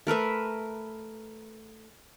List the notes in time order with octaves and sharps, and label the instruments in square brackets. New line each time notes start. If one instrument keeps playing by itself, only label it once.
[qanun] A3 A#4 B4 E5